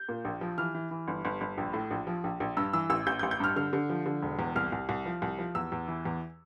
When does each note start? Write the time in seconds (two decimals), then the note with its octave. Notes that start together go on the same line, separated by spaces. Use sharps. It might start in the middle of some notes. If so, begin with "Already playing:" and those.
Already playing: G6
0.09 A#2
0.25 A#1
0.41 F3
0.58 E3 F6
0.75 E3
0.91 E3
1.08 G1
1.25 G1
1.41 G1
1.58 A#1
1.73 A2
1.91 A#1
2.07 F3
2.24 A#1
2.40 A#1
2.57 G2 E6
2.73 E3 E6
2.90 A1 E6
3.07 A1 G6
3.19 G6
3.23 A1
3.31 G6
3.40 G2 F6
3.56 D3 F6
3.73 D3
3.89 F3
4.06 D3
4.22 E1
4.39 E2
4.56 C2 F6
4.72 C2
4.89 C2
5.06 F3
5.22 C2
5.39 F3
5.55 E2 E6
5.72 E2
5.88 E3
6.05 E2